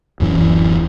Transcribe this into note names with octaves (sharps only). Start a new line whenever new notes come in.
D1 F#2 E3